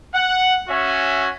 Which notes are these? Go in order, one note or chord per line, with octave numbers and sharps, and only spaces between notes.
F#5
C#4 F#4 C#5 E5 G#5